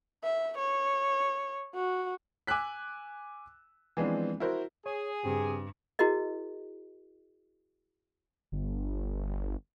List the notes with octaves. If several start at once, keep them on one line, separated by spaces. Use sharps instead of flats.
E5
C#5
F#4
G#5 D6 E6 F#6 B6
E3 F3 G#3 B3 C4 D4
E4 F#4 A#4 C5
G#4 C#5
G2 C#3 C4 G4
E4 F#4 G#4 A#4 D#5
G1